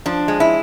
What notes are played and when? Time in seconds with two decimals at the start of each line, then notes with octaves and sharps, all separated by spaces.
0.06 F3 D4
0.28 G#3
0.40 E4